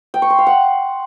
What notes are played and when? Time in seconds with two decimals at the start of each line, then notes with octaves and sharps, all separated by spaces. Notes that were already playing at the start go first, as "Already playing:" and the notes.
0.14 G5
0.22 C#6
0.30 C6
0.38 F5
0.47 F#5